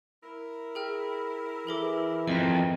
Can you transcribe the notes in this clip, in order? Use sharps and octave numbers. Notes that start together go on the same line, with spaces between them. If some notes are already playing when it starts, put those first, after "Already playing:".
E4 A#4
G#4 G5 F6
E3 G#4 A4 D6
F2 D#3 D#5 A#5